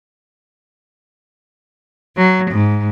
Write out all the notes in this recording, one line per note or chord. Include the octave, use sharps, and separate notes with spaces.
F#3
G#2